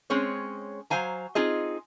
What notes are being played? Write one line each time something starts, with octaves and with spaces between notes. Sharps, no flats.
G#3 C4 C#4 G#4 C#5
F#3 A3 C5 F5 G#5 A#5
C4 D#4 F4 G#4 D#5